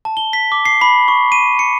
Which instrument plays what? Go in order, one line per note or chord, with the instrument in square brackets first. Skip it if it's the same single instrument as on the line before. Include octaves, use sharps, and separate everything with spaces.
[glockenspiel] A5
G7
B6
D6
C7
B5
C#6
D#7
C#7